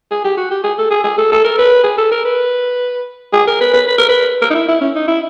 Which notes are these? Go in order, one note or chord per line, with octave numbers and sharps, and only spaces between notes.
G#4
G4
F#4
G4
G#4
A4
G#4
G#4
A4
A4
A#4
B4
G#4
A4
A#4
B4
G#4
A#4
B4
B4
B4
A#4
B4
A#4
D#4
E4
E4
C#4
D#4
E4